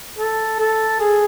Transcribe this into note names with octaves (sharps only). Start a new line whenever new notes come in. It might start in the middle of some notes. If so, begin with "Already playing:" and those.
A4
A4
G#4